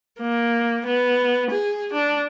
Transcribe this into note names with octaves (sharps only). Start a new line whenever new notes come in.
A#3
B3
G#4
D4